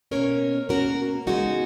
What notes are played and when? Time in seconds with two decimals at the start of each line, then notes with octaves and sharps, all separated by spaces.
0.11 B2 A#3 C#4 A#4 C#5
0.69 B2 A#3 C#4 F#4 A#4
1.27 C#3 G#3 B3 D#4 F#4